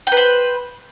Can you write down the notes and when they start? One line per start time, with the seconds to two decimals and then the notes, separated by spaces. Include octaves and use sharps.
0.07 G5
0.12 B4
0.17 C5